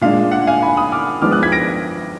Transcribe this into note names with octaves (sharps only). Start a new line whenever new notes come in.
A#2 G#3 D4 F5
F#5
F5 G#5
G#5 B5
B5 D#6
D6 F6
F3 G#3 B3 D4 D6 F6
D#6 F#6
G#6 B6
A#6 D7